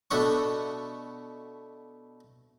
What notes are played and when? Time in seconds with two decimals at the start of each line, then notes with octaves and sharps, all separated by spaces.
0.11 B2 A3 D4 F#5 C#6